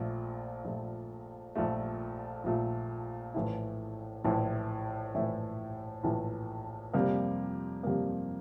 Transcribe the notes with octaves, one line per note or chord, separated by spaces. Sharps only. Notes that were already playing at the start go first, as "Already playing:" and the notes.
Already playing: A#1 A#2 A3
A#1 A#2 A3
A#1 A#2 A3
A#1 A#2 A3
A#1 A2 E3 A3 E4
A#1 A2 E3 A3 E4
A#1 A2 E3 A3 E4
A#1 A2 E3 A3 E4
F2 C3 G3 A#3
F2 C3 G3 A#3